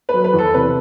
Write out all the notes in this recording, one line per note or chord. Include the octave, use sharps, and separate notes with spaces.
F#3 B4
B4
E2
A4
C3 B4